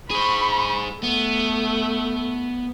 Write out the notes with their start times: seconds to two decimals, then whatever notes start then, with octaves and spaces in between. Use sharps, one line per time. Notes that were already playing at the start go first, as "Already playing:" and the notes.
0.10 G#4 C5 B5 C#6
1.03 A3 B3